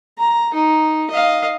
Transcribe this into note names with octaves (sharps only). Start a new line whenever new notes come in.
A#5
D#4
D#5 F5